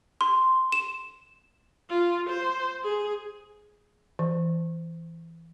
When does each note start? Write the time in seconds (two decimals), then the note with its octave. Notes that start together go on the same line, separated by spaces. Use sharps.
0.21 C6
0.72 E7
1.90 F4
2.29 C5
2.84 G#4
4.19 E3